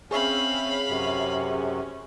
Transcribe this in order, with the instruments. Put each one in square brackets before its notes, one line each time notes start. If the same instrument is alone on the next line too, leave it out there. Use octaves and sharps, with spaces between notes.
[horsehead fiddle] C4 C#4 [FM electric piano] G#4 C#5 E5 [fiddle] F5 B5
[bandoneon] F#2 C3 [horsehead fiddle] C#4